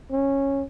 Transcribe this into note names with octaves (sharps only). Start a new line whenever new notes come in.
C#4